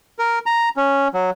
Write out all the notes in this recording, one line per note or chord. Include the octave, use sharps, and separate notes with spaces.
A#4
A#5
C#4
F#3